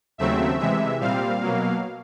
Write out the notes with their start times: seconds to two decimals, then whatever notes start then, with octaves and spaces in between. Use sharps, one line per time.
0.18 D#2 C#3 F#3 A3 C4 E5
0.59 C3 E3 G#3 E5
1.00 A#2 G3 C4 F5
1.40 B2 F#3 A#3